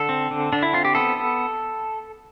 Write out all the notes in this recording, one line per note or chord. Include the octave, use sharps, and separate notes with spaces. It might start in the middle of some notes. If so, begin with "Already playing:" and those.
Already playing: D3 A4
C4
D3
D3 D4
E4
C4 F4
G4
B3 A4